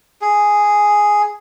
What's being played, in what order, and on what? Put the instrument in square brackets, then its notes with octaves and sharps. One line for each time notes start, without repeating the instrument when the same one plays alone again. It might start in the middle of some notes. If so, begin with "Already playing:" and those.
[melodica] G#4